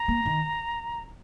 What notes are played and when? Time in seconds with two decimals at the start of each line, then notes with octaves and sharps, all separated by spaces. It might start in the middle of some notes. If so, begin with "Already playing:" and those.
Already playing: A#5
0.08 A#3
0.26 D#3